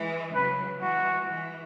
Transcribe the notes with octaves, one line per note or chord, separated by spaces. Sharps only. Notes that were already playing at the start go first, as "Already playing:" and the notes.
Already playing: E3 G#3
C#3 F#3 B4
E3 G#3 F#4
E3